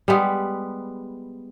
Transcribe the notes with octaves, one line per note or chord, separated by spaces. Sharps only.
G3 G#3 B3